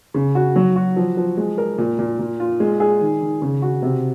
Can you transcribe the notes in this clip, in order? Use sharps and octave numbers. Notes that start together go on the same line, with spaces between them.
C#3
F#4
F#3
F#4
F3
F3
G#3
A#4
A#2
A#2
A#2
F4
G#3
G#4
D#3
D#3
C#3
F#4
C3